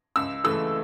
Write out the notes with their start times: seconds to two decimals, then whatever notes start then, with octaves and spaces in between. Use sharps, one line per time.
0.16 C#2 E6
0.44 C#3 E3 A3 E6